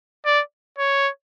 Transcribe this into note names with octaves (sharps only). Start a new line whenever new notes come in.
D5
C#5